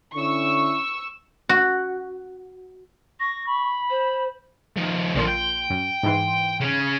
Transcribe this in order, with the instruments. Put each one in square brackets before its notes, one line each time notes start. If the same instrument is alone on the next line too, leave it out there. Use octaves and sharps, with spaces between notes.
[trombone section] D3 C#4 E4 [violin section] C#6 E6
[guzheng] F#4
[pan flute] C#6 [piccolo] A#6
[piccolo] B5
[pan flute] C5
[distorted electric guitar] D#3 F3
[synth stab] A#1 A#2 C6 [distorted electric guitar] D3 F3
[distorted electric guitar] G5
[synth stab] F#2
G#2 E3 C6
[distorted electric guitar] C#3 C#4